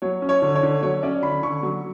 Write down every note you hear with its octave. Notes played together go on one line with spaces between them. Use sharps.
F#3 C#5
C#4
C#5
D3
C#5
D3
F#3 C#5
C#4 D5
D3 B5
D3 C#6
F#3